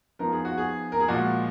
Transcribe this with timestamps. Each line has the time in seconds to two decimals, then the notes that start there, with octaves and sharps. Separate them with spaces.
0.19 F3 B3 D#4 A#4
0.32 G#4
0.45 F#4
0.58 G#4
0.92 A#4
1.00 G#4
1.08 A#2 F3 G#3 F#4